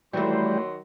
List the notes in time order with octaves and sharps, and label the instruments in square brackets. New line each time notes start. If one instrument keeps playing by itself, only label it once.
[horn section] D#3 F#3 C6 [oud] E3 A3 [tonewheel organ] G3